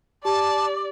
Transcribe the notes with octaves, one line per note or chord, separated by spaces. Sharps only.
G4 D5 A5